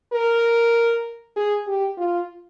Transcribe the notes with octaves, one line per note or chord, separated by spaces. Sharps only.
A#4
G#4
G4
F4